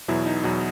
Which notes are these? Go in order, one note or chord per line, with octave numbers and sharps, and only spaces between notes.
E2 B2 F#3 E4
D#4
E2 B2 F#3